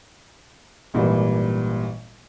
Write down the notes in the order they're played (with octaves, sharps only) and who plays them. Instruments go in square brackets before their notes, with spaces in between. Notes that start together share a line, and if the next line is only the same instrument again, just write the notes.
[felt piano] G#1 A#2 E3 G3